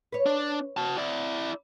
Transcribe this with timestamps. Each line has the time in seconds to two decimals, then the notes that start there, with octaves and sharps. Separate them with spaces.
0.12 B4 C#5
0.26 D4
0.77 F#4 A5
0.97 E4 D5